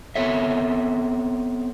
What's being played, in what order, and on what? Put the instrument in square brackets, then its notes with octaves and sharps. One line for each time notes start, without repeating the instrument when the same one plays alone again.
[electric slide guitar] B3 C4 A4 C#5 E5